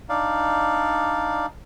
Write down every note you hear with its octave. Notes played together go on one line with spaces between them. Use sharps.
D4 D#4 D5 F5